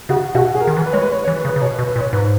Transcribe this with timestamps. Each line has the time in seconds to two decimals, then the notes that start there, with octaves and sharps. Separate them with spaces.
0.09 C#3 F#4
0.35 B2 F#4
0.55 G#4
0.60 A#4
0.67 D#3
0.77 E3
0.86 B4
0.93 G#3 C#5
1.02 B4
1.11 C#5
1.18 B4
1.24 C#5
1.28 E3
1.36 B4
1.45 C#3
1.49 B4
1.56 C#3
1.61 B2 C#5
1.75 B4
1.79 B2
1.87 B4
1.96 A#2
2.00 C#5
2.13 G#2 B4